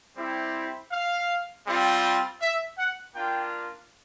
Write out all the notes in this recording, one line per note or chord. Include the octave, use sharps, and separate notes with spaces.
G3 C4 E4 G4
F5
G3 C4 F4
E5
F#5
A#3 D4 F4 G5